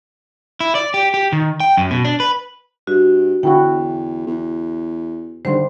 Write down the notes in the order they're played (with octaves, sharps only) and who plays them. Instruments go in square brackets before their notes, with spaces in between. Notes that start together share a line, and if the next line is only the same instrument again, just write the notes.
[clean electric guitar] E4
D5
G4
G4
D#3
G5
F#2
B2
D4
B4
[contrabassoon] G2 [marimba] F#4
[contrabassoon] E2 [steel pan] D3 E4 F#4 [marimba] G5
[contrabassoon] E2
[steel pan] D3 D#3 G3 [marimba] C5 F#5 C6